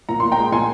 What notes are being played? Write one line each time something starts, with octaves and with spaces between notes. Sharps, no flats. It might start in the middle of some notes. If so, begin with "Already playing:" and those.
A#2 A#5
A#2 C6
G5 A#5
G#3
A#2 G#5 C6